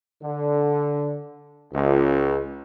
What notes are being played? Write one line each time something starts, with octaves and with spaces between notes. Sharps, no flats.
D3
C#2